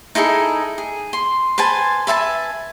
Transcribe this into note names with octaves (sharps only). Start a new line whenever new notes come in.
D#4 E4 G#4 A4
G#4
C6
B4 C5 G#5 A5
B4 E5 G#5 A5